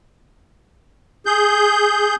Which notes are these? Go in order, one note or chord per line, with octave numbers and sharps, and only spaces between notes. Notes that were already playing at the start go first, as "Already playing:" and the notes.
G#4 G6